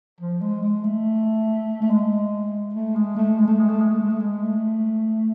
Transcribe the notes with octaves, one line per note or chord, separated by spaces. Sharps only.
F3
G#3
G#3
A3
A3
G#3
A3
G#3
A3
G#3
A3
G#3
A3
G#3
A3
G#3
A3
G#3
A3